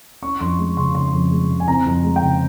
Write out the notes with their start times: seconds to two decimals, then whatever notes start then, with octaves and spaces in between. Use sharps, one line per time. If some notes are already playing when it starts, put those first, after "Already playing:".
0.22 C#4 C#6
0.41 F2 C6
0.59 G#3
0.77 C#3 C6
0.95 C#4 C6
1.13 F2
1.31 G#3
1.50 C#3
1.60 G#5
1.68 C4 A#5
1.86 F2
2.04 G#3
2.16 G5
2.22 C#3